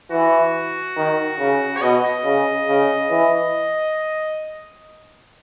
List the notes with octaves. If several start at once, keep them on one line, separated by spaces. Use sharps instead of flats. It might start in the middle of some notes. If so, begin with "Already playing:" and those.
E3 F#4
D#3
C#3
C#5
B2 D#5
C#3
C#3
E3